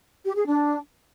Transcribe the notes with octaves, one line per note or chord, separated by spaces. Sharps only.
G4
G#4
D4